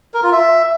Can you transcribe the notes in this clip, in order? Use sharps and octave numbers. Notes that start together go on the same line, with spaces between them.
A#4
F4
E5